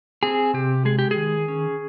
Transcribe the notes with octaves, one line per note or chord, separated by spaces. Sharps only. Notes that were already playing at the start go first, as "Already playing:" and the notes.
C4 G#4
C3 G4
G#3 G#4
G4
D#3 G#4
C#4